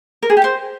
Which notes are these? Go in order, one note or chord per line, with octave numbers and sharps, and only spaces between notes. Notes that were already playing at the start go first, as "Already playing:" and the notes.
A#4
G#4
G4
C5